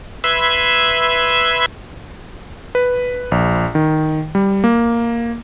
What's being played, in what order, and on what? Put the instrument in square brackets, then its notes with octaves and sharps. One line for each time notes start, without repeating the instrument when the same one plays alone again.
[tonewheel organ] B4 E5 B5 C6 E6 G#6
[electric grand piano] B4
A#1
D#3
G3
A#3